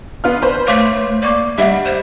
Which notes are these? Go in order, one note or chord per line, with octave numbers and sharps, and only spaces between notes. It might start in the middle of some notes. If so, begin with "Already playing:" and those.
B3 F4 F6
B4 C5
A3 C#5 F5 D6
A#3 D5 C#6 D6
G3 D#5 E5 F#5
C5